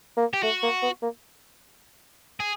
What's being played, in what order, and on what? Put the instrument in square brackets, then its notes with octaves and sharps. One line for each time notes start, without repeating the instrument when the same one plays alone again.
[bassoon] A#3
[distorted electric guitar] G4
[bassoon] A3 [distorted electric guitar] F#4
[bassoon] A#3
B3
A#3
[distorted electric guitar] G#4